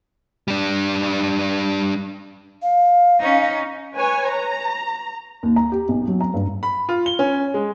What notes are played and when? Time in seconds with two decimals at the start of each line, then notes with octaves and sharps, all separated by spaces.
0.48 G3 D4
2.63 F5
3.20 C#4 D#4
3.93 B4 C#5 G#5
4.30 A#5
5.43 D#2
5.56 A#5
5.72 G4
5.89 B1
6.08 F#3
6.21 A#5
6.34 G2
6.63 B5
6.89 F4
7.06 G7
7.19 C#4
7.54 G#3